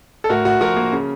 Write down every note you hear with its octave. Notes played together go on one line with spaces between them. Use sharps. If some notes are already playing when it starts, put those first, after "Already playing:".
A4
A2 F#4 A#4
A2 F#4
F3 F#4 A#4
A#3
C#3